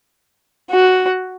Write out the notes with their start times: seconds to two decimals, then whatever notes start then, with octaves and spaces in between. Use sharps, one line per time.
0.71 F#4